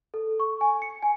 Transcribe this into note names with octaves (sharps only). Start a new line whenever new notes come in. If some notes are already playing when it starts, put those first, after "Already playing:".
A4
C#6
G#5
C#7
G#5